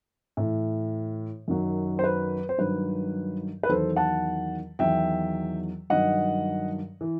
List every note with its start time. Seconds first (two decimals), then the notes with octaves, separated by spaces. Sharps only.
0.37 A2 E3
1.48 F#2 D#3 F#3
1.99 C5
2.04 B4
2.49 C5
2.58 G2 D#3 F#3 B4
3.63 B4
3.69 E2 D#3 F#3 A4 C5
3.96 F#5 A5
4.79 E2 D#3 F#3 E5 G5
5.90 G2 D#3 F#3 D#5 F#5
7.01 E3